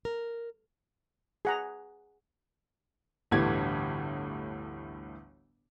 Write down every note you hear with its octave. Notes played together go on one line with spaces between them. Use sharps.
A#4
G#4 F#5 A#5
G1 D2 A2 E3 G4 G#6